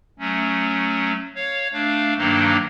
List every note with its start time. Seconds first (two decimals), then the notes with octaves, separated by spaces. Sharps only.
0.19 F#3 A3 C#4
1.35 C#5 F5
1.73 A3 D4 F5
2.18 G2 D#3 F#3 A#3 D4 D#4